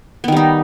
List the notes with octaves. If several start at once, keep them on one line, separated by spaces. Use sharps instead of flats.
D#3 G3 B3 D#4